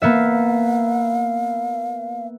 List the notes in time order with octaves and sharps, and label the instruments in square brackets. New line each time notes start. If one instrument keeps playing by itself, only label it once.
[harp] A#3 B3 E5 [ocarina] F5